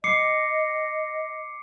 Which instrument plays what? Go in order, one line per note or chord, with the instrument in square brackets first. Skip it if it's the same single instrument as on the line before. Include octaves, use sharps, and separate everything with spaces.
[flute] D#5 [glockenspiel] D6 C7 C#7